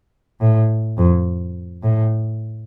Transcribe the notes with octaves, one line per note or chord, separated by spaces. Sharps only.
A2
F2
A2